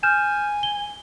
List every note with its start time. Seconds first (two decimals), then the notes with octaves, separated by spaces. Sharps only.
0.03 G#5 F6 G6 E7
0.63 G7